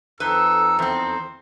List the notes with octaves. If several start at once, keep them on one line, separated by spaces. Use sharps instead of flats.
F2 D#4 A4 B4 C5 E6
E2 C4 C5